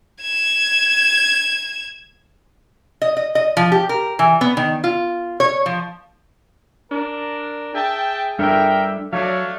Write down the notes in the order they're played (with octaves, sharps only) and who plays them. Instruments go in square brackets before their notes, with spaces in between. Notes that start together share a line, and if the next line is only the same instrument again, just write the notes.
[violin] G#6 E7
[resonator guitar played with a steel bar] D#5
D#5
D#5
F3
G4
A#4
E3
B3
D#3
F4
C#5
F3
[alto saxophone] D4 [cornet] A#4
[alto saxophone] G#4 [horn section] E5 G5 A5
[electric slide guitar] G3 D4 A4 [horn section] A#4 G5 [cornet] E5
[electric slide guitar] F#3 [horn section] A3 D4 [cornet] C#5 [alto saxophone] F5